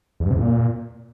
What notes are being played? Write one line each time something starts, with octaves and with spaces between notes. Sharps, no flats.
E2
G2
C3
E2
A#2